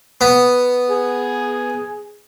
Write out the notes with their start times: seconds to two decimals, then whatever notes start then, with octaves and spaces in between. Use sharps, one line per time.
0.21 B3
0.90 G#4